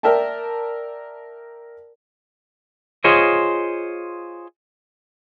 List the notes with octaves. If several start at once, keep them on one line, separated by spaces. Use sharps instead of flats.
A#4 D5 E5 G5 A5
F4 G#4 C5 C#5 D#5